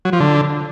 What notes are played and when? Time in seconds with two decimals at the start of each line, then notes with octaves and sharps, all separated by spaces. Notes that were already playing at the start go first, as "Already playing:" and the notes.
0.05 F#3
0.13 F3
0.20 D3